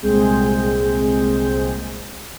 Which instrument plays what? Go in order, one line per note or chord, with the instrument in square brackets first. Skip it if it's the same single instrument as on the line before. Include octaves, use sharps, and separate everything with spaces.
[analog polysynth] C2 A#2 G#3 C4 G#4 G6